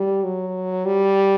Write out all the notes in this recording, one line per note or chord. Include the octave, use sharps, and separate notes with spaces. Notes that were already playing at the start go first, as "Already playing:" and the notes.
Already playing: G3
F#3
G3